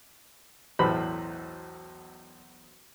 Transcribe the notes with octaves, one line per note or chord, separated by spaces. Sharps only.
B1 E2 A2 C5 B5